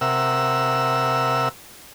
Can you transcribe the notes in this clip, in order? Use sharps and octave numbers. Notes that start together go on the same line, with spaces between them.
C3 A#4 E5 F#5 E6